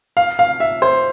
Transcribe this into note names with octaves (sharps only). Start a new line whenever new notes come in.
F5
F5
E5
C5